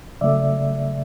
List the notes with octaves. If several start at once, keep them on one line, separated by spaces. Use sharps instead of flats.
C#3 F#3 A3 D5 E5